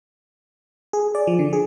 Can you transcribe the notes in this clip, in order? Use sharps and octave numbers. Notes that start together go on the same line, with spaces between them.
G#4
D5
F3
D3
G#4